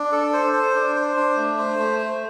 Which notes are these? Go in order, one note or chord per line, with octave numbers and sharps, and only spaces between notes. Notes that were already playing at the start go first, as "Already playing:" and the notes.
Already playing: D4
A4
C5
C5
D4
C5
D4
A3
C5
A3
C5